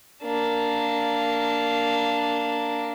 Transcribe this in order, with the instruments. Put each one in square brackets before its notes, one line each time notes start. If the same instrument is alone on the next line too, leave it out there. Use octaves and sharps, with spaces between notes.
[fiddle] A#3 D4